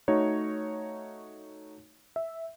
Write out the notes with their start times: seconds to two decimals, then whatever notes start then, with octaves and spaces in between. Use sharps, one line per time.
0.08 A3 D#4 F#4 C#5
2.16 E5